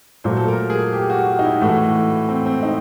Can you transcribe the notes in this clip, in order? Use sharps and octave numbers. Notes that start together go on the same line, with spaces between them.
A#2 F#3 A3 C5
A4
A#4
G#4
G4
F#4
F#4
D#4
E4
A2 E3 A3 F#4
C4
C4
D#4